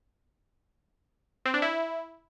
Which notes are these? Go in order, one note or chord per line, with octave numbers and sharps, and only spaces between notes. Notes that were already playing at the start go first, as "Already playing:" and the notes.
C4
D4
E4